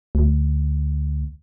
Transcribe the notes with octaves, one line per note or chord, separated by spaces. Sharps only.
D2